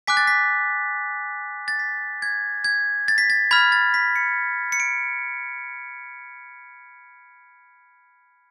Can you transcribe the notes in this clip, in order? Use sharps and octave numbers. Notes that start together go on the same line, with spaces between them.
G#5 D6 F#6 B6
A6
B6
A6
B6
G#6
G#6
A6
B6
A6
B5 F6 G#6
A6
B6
C#7
C#7
D7